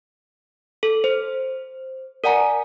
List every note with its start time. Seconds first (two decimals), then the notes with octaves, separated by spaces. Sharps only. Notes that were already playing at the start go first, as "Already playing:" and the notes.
0.83 A4
1.04 C5
2.24 A#4 D5 F#5 G#5 A#5